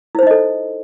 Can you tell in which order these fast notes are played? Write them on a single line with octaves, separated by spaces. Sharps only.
E4 C5 D#4 D#5 A4